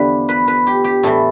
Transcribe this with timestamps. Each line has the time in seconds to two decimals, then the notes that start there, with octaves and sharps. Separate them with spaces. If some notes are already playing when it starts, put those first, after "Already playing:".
Already playing: E2 D3 F3 G4 B4
0.29 B4
0.48 B4
0.67 G4
0.84 G4
1.03 A2 E3 A4